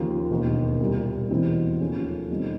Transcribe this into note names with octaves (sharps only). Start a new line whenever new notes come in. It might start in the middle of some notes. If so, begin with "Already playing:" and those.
Already playing: D#2 C#3 F3
E1 D#2 D#3
C2 A#2 G3
E2 B2 G#3 C4 E4
D#2 C#3 F3 A3 C#4
B2 G3 C4 D#4